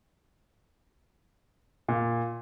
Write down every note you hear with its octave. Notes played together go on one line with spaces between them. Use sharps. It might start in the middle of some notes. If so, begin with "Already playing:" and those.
A#2